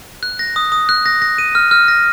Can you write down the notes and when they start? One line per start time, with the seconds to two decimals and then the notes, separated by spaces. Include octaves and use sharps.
0.23 F#6
0.39 A#6
0.56 D#6
0.72 D#6
0.89 F#6
1.06 A#6
1.22 A#6
1.38 D#7
1.55 F6
1.71 F6
1.88 A#6